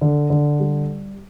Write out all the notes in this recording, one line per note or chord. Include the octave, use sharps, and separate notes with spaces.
D3
D3
G3